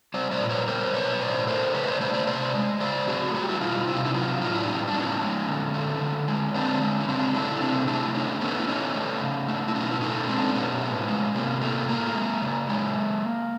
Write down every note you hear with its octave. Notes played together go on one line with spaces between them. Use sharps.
G3 C5 D5
C5 D5
A#2
B4 C#5
G3 A#4 C5
B2 B4 C#5
A2 C5 D5
A3 A#4 C5
C#3 B4 C#5
D#5
C5 D5
A3 C5 D5
C5 D5
C3 C5 D5
G#3
C#3 C5 D5
A3 F#4 G#4
G3 F#4
G4
E4 F#4
B2 D#4 F4
C3 E4
F4
D4 E4
F#3 D#4 F4
A2 D#4 F4
D4 E4
G3 C#4 D#4
D4
A2 C#4 D#4
G#3
D3
A3
D3
G#3
D3 C4 D4
G#3
C#4
C#3 C4 D4
A3 D4 E4
C3 C4 D4
A3 D4 E4
D3 C#4 D#4
A3 B3 C#4
E4
D3 C#4 D#4
A3
C#3
A3
E4
B2 C#4 D#4
E4
A3 C#4 D#4
G#3 C4 D4
B2 B3 C#4
A2
G#3
C3 A#3
A3 A#3
A2 A#3
G#3
C#3
G#3